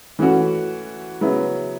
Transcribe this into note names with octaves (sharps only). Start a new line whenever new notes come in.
E3 A3 C#4 F#4
C#3 F#3 B3 E4